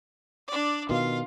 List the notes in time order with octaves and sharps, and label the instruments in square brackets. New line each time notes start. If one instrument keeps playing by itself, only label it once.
[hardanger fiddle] D4 D5
[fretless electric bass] B2 D#3 [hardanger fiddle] F4 F5